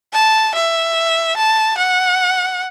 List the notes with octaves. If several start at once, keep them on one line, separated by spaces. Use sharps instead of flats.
A5
E5
A5
F#5